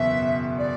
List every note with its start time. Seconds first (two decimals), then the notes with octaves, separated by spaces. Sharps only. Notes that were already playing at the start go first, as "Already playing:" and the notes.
Already playing: F#1 E2 B2 B3 E5
0.58 D5